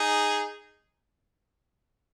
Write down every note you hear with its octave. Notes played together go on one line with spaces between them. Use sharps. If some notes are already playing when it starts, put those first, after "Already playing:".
Already playing: D#4 G#4